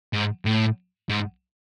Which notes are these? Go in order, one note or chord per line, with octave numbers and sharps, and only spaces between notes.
G#2
A2
G#2